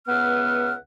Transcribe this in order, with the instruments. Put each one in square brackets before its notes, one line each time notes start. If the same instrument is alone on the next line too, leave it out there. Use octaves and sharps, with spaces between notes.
[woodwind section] C#2 B3 B4 E5 F#5 F6